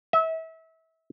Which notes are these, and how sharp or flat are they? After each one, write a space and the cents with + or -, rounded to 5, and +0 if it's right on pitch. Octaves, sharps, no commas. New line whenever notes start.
E5 -30